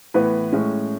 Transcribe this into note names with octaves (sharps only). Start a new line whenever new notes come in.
A2 E3 B3 B4
A2 G#3 C#4